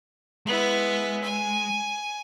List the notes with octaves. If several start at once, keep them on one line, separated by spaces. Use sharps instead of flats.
G#3 B3 E4
G#5